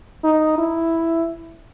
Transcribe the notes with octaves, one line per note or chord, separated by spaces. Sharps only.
D#4
E4